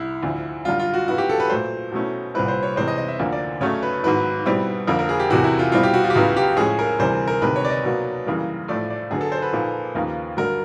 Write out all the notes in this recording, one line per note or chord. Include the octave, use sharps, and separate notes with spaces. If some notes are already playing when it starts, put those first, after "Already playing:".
Already playing: C2 E4
D2 D3 F3
F#2 D3 G3 F4
F4
F#4
C#3 F#3 B3 E4 F#4
G4
A4
B4
A#2 F#3 A3 C5
B2 F#3 A3 C#4 E4
C2 A#2 G3 C4 E4 B4
C5
C#5
C3 E3 G#3 C4 C5
D#5
D#5
E5
D2 D3 F3 A#3
D5
C#3 F#3 A3 C#4 C#5
B4
G#2 D#3 F#3 B3 E4 B4
B2 G3 C4 E4
F2 D3 F3 A#3 A#4
A#4
G#4
G4
E2 C3 E3 F#4
E4
F4
B2 G3 C4 E4 F4
G4
F#4
F4
G4
C#2 C#3 F#3 B3 E4 F#4
G4
A2 F3 G#3 C#4 G#4
A#4
D2 C3 E3 G3 C5
A#4
D2 C3 D#3 G#3 B4
C#5
D5
D#5
B2 F#3 A#3
F#2 C#3 E3 G3 A#3
A2 F3 A3 D5
D5
F#2 D3 F#3 B3 G#4
A4
C5
B4
A#2 F3 A#3 D#4
D#2 C#3 F3 A#3 D#4
G2 D3 F#3 A#4